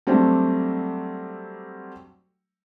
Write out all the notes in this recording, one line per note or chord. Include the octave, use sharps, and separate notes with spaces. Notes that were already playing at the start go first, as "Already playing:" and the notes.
F#3 G3 A3 C4 D4